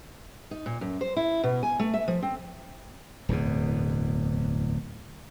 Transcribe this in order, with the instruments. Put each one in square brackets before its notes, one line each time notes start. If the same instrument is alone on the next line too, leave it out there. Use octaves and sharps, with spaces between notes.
[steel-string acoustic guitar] D#4
A#2
F#2
C5
E4
B2
G#5
A3
E5
F3
C4
[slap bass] D1 E2 B2